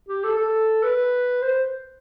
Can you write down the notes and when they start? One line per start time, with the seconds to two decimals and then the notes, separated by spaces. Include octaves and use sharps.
0.09 G4
0.24 A4
0.38 A4
0.83 B4
1.42 C5